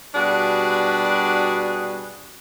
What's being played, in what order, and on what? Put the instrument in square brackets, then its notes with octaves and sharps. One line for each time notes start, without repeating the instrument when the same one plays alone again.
[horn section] B2 G3 D4 F#4 G#4 B4